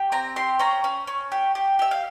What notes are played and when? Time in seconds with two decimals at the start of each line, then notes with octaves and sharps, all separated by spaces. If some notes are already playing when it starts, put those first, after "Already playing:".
Already playing: G4
0.12 C4 A#5
0.36 G4 C6
0.59 C#4 A#5
0.84 C#4
1.07 C#4
1.32 G4
1.55 G4
1.79 G4 E5
1.91 F5